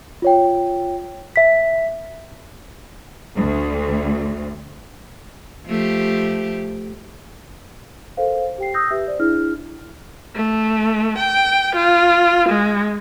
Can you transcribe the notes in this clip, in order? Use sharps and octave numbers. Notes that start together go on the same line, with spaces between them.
F4 C#5 G5
E5 B6
D2
F3 A3 G4
A4 A#4 C5 F5
G4 G5 C7
D#6 E6 G6 A#6
G4 B4 E5
C5 D5
D4 E4 G#4 F6
A3
G5
F4
G#3